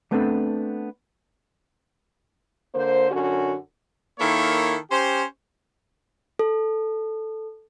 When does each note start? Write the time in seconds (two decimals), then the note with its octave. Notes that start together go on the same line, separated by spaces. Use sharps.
0.11 G3 A3 B3 C4 D4 A4
2.74 D3 A#3 C5
3.11 F#2 D3 C#4 F#4
4.20 D#3 A#3 E4 A4 C#5
4.91 C#4 G4 C5
6.39 A4